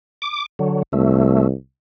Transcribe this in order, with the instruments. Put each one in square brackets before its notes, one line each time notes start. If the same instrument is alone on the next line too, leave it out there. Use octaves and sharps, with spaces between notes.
[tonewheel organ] D6
D3 F#3
[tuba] C2 [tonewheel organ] A3